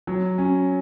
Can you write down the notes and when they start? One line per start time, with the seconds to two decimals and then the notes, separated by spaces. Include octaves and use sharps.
0.07 F#3
0.38 C#4